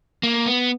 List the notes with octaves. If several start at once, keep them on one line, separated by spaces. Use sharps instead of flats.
A#3
B3